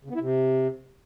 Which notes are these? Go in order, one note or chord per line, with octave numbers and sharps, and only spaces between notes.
C#3
B3
E4
C3